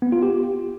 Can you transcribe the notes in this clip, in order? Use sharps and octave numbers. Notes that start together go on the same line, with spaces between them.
B3
F4
G4